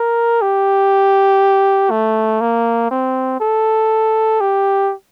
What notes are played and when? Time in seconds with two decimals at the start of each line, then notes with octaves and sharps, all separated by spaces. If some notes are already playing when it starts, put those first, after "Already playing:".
Already playing: A#4
0.42 G4
1.91 A3
2.41 A#3
2.91 C4
3.40 A4
4.41 G4